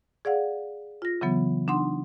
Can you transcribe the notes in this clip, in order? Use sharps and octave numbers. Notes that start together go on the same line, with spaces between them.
G#4 D5 F5 F#5
F4 A#6
C#3 E3 F#3 B3
D4 D#4 F#5 C6